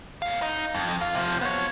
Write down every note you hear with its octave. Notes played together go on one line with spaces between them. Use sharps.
G#2 F5
D#4
F2
F4
C3 F3
B3 C#5